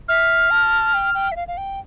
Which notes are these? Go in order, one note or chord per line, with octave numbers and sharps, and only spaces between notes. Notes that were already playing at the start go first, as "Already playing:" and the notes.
E5 F6
A5
G5
G5
E5
F5
F5
G5